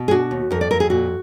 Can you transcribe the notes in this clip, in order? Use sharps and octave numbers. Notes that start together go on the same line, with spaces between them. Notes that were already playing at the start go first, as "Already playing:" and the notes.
Already playing: B2
G#4
D4 F#4
D#2
F2 A#4
D5
F2 A#4
G#4
A#2 F#4